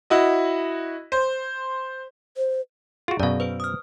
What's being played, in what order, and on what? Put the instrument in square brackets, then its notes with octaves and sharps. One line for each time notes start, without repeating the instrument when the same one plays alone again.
[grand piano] E4 F#4 D#5
C5
[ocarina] C5
[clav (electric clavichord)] F4 F#4 [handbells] G#4
[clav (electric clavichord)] F#2 B2 [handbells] D5 F5
[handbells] B4 C5 D7
D#6 F6